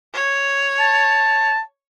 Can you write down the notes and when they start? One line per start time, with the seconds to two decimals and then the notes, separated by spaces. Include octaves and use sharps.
0.15 C#5
0.80 A5